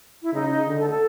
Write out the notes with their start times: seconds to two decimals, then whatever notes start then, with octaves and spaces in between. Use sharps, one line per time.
0.23 E4
0.33 C#3 D#4
0.50 D#4
0.67 D3
0.78 A4
0.90 A4